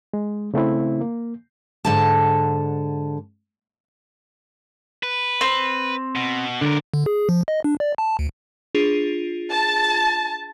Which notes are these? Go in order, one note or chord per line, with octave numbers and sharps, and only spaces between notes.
G#3
C#3 A3 C4 E4
A#3
G#2 D3 A5
B4
C4
B2
C#2 D3 A#4
D3
G#4
F3
D#5
D4
D5
A5
D2
D4 F4 G#4
A5